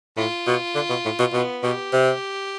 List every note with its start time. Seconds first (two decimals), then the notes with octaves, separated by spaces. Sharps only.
0.17 A2 F4
0.47 B2
0.75 D3
0.90 B2
1.05 A2
1.19 B2
1.34 B2 B3
1.63 B2 G4
1.93 C3